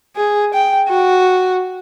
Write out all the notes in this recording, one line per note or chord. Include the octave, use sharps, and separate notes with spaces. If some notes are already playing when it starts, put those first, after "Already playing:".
G#4
G5
F#4